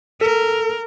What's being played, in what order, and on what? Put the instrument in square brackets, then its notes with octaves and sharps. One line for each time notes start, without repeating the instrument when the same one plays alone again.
[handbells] A4 [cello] A#4